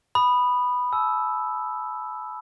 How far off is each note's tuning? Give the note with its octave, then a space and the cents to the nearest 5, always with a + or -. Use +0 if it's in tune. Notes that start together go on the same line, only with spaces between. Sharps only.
B5 +0 D#6 -20
A5 -45 E6 +0